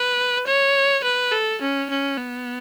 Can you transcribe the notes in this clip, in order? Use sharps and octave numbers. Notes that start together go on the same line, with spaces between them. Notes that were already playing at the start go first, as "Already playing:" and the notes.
Already playing: B4
C#5
B4
A4
C#4
C#4
B3